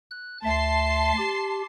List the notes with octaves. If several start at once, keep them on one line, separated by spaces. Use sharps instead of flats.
F#6
D2 E5 A5 C6 C7
G4